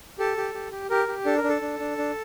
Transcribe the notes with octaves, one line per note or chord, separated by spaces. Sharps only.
G4 A4
G4
G4
G4
G4 A#4
G4
D4 A4
A#4
D4
A4
D4
D4
D4